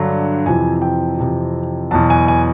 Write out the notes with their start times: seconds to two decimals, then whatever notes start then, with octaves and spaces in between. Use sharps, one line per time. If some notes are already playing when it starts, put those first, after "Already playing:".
Already playing: G2 D3 F#3
0.46 F2 C3 E3 G#5
0.82 G5
1.18 F2 C3 E3
1.91 E2 B2 F#3 A5
2.10 G#5
2.28 G#5